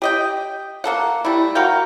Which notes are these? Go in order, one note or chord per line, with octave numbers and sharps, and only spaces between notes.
G4 D#5 G5
A#3 A4 F#5
G3 A3 E4
F#4 A#4 F5 G5